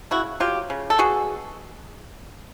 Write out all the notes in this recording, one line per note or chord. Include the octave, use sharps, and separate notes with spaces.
C#3 E4 F#4
F#3 F4 G4
C#3
A4
B2 F#4 G#4